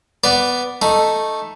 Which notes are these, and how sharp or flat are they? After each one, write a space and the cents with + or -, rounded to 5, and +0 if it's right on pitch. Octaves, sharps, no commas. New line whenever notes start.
B3 +0 D5 -5
A3 +0 D#4 +0